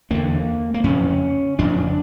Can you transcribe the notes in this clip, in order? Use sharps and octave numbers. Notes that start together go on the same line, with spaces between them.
E2 D3 A#3
A#3
F2 C#3 C#4
F2 C#3 D4